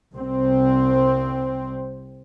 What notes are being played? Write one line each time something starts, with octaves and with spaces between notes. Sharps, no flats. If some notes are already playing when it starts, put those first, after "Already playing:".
C2 C4